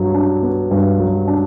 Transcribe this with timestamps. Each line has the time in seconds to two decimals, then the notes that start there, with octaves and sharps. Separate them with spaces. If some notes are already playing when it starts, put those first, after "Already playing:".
Already playing: G2 F#3
0.14 D4
0.43 B3
0.71 G2
1.00 F#3
1.28 D4